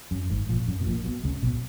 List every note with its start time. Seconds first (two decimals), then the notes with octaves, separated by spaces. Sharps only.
0.11 F#2
0.30 G#1 G#2
0.49 A#1 A#2
0.68 F#2
0.81 B2
0.86 A#1 A#2
1.05 B1 B2
1.24 C#2 C#3
1.43 B1 B2